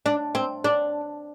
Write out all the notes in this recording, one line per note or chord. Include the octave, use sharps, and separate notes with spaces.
D4
C4
D4